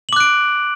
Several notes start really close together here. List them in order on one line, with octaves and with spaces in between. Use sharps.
F#7 D6 F#6 D7